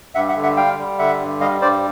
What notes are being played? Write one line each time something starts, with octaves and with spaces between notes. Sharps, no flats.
G2 E5 F#5
E5 F#5
D3
E5 F#5
G3 F5 G5
G3
D3 E5 F#5
G2
G3 D#5 F5
G2 C5 D5